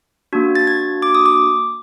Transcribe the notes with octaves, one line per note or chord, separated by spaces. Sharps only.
A#3 D4 F#4
A6
G#6
D6
D#6
D6